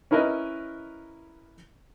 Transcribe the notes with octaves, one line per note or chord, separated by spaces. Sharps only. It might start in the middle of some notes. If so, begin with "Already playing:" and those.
C#4 E4 A#4 B4 D#5